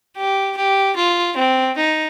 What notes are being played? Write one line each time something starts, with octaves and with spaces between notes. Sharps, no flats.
G4
G4
F4
C4
D#4